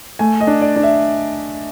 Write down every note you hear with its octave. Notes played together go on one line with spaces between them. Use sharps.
A3 G#5
D#5
D4
D5
D4
E5